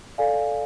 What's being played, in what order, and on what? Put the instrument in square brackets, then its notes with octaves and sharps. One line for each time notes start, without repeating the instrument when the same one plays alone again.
[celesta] A4 D5 F5 G#5